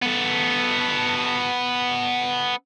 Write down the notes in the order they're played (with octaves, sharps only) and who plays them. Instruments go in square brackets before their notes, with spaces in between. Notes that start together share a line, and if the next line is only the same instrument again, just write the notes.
[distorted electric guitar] B3 A4